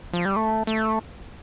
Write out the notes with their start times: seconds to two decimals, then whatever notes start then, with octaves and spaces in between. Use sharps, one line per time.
0.13 F3
0.25 G3
0.36 A3
0.67 A3